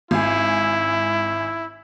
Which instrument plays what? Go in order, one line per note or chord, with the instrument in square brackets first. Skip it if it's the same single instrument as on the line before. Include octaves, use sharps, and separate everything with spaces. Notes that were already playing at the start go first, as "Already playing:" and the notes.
[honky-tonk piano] G#1 G#5 [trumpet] E4